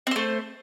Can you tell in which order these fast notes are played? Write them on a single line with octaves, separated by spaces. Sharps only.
C4 C5 A3